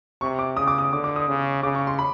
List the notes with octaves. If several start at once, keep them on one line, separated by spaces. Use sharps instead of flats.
C3 C#6
D6
C#3 D#6
D6
D#6
D3 D6
D6
D#6
C#3
C#3 D6
C#6
C6
B5